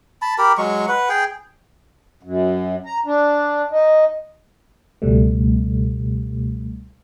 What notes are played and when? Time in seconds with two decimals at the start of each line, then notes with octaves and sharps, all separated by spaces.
0.22 A5 B5
0.38 G4 A#4 B5
0.58 F#3 G#3 C#6
0.88 B4 F#5
1.09 G#4 G5
2.23 F#2
2.86 A#5
3.06 D4
3.71 D#4
5.02 C#2 B2 G3 A3